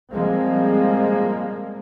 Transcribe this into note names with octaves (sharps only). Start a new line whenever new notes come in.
F3 G3 G#3 A#3 C4